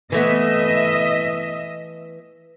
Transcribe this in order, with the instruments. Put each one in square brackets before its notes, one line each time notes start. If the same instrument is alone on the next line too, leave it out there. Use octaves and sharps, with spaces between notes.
[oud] E3 A3 B3 [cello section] D#5 E5